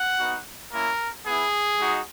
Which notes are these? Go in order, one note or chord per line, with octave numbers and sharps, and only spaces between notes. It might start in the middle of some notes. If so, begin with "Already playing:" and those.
Already playing: F#5
B3 D#4 F#4
A#3 C#4 E4 A#4
B3 E4 G#4
G#3 D#4 F#4